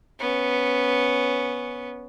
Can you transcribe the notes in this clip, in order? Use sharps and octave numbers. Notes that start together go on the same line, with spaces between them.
B3 C#4